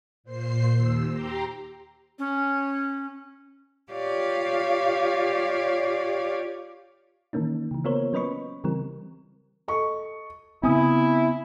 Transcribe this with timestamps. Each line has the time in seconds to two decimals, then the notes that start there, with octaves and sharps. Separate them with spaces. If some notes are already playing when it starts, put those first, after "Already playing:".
0.24 A#2 C5 C7
0.73 D#2 E6
1.09 G4 A#5 C6 D6
2.19 C#4
3.91 F4 G4 C#5 D5 F5
7.33 D#3 E3 A#3 C#4 D#4
7.71 C#3 E3
7.84 A#3 B3 F4 A#4 C5 C#5
8.13 F#3 C#4 B4 D#5 B5 C#6
8.64 C#3 E3 G3 C4 A#4
9.68 A4 D#5 C#6
10.63 C#3 B3 C4 E4 G#5 D#6